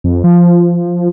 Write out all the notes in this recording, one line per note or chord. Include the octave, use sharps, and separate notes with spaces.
F2
F3